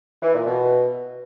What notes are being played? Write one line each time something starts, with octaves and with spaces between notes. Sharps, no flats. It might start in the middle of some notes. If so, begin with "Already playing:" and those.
E3
A#2
B2